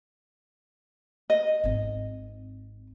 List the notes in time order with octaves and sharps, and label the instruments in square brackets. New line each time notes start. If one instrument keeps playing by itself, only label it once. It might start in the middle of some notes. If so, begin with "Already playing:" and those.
[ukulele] D#5
[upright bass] G#1 C4